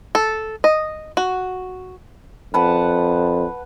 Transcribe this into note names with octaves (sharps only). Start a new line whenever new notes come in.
A4
D#5
F#4
F2 B4 F#5 A5